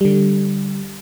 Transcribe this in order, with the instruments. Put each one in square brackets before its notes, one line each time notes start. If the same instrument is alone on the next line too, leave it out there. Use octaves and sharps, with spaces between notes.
[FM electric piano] D3 G3